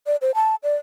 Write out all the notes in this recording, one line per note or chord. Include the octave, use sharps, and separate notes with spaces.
D5
C5
A5
D5